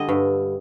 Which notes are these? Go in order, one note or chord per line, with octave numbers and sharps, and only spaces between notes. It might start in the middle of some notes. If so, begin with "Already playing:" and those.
Already playing: D3 G3 D#5
G2